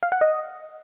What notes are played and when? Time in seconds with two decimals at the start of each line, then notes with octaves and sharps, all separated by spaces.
0.03 F5
0.12 F#5
0.21 D#5